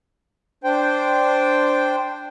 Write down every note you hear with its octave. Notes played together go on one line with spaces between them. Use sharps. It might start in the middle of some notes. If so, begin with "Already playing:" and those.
D4 C5 G5